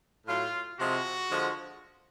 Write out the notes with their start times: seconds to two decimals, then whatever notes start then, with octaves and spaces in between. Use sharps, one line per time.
0.26 A2 F#3 F4
0.78 C3 F3 G#3 F#4
1.31 D3 F3 G#3